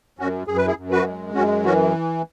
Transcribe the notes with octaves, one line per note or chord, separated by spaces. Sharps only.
F#2 C#4 F#4
F#2 G#4
B4
E4 G#4
F#2
F#4 B4
G#3
F#2 C#4 F#4
E3 C#4 F#4